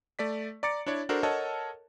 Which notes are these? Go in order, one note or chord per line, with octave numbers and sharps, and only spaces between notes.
A3 D5 B6
D5 A#5 D6 A6 C#7
D4 E4 C#5 D5
D4 F#4 A4 A#4 C5
A4 A#4 C#5 D#5 F#5 A5